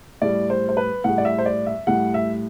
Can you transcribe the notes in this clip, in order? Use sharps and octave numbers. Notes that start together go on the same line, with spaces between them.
A2 G3 D5
C5
C5
B4
A2 G3 F#5
D5
E5
C5
D5
E5
A2 G3 F#5
E5